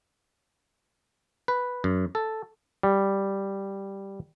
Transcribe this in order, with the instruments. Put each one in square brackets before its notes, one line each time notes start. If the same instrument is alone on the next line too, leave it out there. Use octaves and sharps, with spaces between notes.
[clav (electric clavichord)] B4
F#2
A4
G3